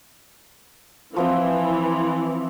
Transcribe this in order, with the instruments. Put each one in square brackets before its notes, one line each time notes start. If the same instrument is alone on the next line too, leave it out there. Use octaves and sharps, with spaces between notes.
[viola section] E3 [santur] F3 C4 G5